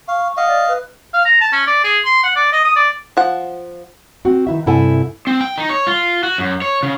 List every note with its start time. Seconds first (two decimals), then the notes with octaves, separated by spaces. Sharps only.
0.08 F5 C#6
0.37 D#5 F5 F#5
0.48 D5
0.68 B4
1.14 F5
1.25 A#5
1.41 A5
1.53 C#4
1.67 D5
1.84 G#4
2.05 C6
2.23 F#5
2.36 D5
2.52 D#5
2.65 D#6
2.76 D5
3.17 F3 F#5
4.25 C4 F#4
4.47 D#3 E4 E5
4.66 G2 C3 E4 A4 F#5 G#5
5.27 C4
5.41 G5
5.58 D#4
5.69 C#5
5.87 F4
6.23 F#4
6.38 F#2
6.62 C#5
6.83 C#3